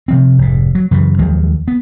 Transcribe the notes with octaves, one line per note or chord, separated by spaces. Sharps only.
C3 F3 C4
F1 G#2
F#3
F#2 C#3 E3
D#2 F3 F#3 G#3
B3